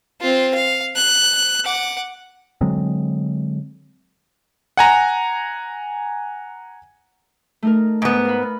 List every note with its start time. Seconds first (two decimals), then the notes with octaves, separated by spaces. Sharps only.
0.21 C4 F4
0.55 F5
0.96 F#6
1.65 F#5 D6
2.61 D3 F#3 G#3 C4
4.77 F#5 G#5 A#5
7.62 A3 D#4 A#4
8.02 G#2 B3
8.25 A#4 F5 B5